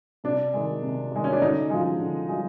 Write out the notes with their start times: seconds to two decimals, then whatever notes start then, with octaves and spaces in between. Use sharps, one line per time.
0.24 C3 D4
0.53 D#3 G#3
0.82 C3
1.12 D#3 G#3
1.24 C#4
1.33 D4
1.41 D3 D#4
1.70 F3 G#3
1.99 D3
2.29 F3 G#3